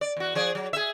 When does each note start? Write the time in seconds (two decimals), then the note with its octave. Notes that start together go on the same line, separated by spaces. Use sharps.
0.01 D5
0.17 E2 F#4
0.35 F3 G#4 D5
0.55 F#3
0.73 G#4 E5